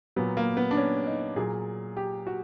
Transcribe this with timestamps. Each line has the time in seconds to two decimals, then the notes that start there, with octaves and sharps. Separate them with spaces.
0.16 A#2 F#3 B3
0.37 A#3
0.57 B3
0.71 D4
0.77 C#4
1.07 D#4
1.36 A#2 F#3 G#4
1.97 G4
2.27 F#4